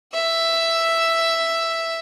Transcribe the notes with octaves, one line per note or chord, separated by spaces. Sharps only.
E5 E6